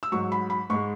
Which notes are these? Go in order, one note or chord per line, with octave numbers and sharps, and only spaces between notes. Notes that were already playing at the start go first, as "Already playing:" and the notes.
E6
G#2 F#3 C#6
B5
B5
G#2 G#3 C#6